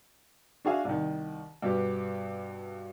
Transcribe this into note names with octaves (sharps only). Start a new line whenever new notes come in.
D4 F#4 G#4 E5 F5
C2 D#3
G2 B2 B3 G4